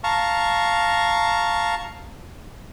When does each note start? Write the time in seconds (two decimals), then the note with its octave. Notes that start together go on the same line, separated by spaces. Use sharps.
0.04 F5 A5 A#5 C#6